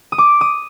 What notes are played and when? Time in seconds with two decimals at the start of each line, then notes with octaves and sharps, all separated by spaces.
0.12 D#6
0.18 D6
0.41 D#6